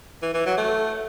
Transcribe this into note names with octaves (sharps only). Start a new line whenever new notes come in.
E3
E3
F#3
A3